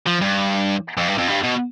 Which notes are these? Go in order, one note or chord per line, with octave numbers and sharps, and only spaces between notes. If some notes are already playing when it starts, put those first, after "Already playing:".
F3
G2
F2
G2
F2
G2
B2